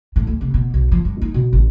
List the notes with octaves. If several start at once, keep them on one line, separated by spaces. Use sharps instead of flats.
A2
D2
C3
B2
B1
F3
G2
D#4
B2
A1